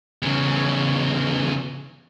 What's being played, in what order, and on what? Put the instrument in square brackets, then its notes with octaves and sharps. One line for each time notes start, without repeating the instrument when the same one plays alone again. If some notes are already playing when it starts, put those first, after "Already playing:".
[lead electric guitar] E2 C#3